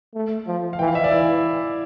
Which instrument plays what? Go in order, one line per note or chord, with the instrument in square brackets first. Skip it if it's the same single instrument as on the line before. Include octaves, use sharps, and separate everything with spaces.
[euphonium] A3
F3
[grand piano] F5
[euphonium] E3 [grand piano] G5
[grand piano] F5
E5
D5
[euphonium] E3 [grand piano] E4